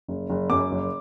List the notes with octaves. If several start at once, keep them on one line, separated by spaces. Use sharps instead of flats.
F#1
F#1
F#2 D6
F#1